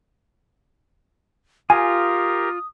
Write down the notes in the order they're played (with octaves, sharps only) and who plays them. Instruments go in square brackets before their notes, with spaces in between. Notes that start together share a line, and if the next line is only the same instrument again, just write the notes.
[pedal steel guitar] F4 [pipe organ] G4 A#4 [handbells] G#5 [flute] D#6